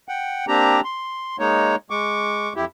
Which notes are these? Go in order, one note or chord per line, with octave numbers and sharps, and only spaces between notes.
F#5 G5
A#3 C4 D4 G4 A#5
C6
G#3 A#3 D#4 C#5
G#3 C#6 D6
F2 E4 G4